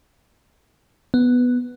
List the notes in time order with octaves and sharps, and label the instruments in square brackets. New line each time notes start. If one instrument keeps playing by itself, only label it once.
[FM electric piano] B3